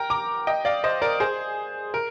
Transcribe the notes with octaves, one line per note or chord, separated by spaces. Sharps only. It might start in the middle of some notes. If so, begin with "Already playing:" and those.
Already playing: A#4 G5 A#5
A#5 D6
D#5 G5
D5 F5
C5 D#5
A#4 D5
G#4 C5
A#4